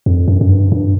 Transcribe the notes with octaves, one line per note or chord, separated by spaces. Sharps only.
F2
F#2
F#2
G2
G2